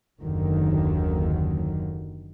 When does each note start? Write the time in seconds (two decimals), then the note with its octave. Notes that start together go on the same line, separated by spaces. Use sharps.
0.22 F#1 D#2 D3 D#3 F#3